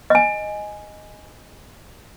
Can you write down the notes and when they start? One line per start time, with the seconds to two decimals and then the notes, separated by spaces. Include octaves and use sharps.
0.10 D#5 G#5